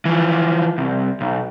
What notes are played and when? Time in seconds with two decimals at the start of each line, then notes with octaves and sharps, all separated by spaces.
0.05 E3 F3
0.78 C2
1.21 B1